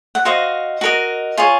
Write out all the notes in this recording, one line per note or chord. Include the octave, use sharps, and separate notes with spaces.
F#5
F#4 C5 D#5 F5
F#4 A#4 D#5
F4 G#4 C#5